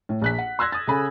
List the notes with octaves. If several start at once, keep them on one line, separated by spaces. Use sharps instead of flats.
A2
A#1 F#6 B6
F#5
C6 E6 F#6 G#6 A#6
D#6 A6
C#3 A4 G#5 B5